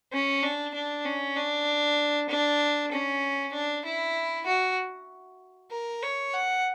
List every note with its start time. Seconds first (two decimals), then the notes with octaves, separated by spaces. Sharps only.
0.13 C#4
0.43 D4
0.75 D4
1.05 C#4
1.36 D4
2.30 D4
2.92 C#4
3.53 D4
3.85 E4
4.46 F#4
5.71 A#4
6.03 C#5
6.34 F#5